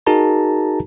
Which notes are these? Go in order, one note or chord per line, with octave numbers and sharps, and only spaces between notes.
D#4 F#4 G#4 A#4 A5 A#5